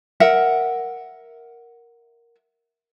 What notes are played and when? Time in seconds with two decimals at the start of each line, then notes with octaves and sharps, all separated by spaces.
0.20 A#4 E5 F#5